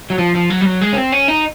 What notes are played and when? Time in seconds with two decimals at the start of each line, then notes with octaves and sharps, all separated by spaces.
0.10 F#3
0.18 F3
0.35 F3
0.50 F#3
0.61 G3
0.66 F#3
0.81 G#3
0.93 C#4
0.97 C4
1.12 C#4
1.28 D#4